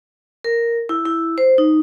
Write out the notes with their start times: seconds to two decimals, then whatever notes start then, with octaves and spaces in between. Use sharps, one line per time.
0.44 A#4
0.89 E4
1.05 E4
1.38 C5
1.58 D#4